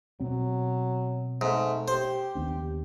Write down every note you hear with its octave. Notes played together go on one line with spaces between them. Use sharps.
B2 F#3 C4
G#2 A3
G4 C5
D#2 B3 D4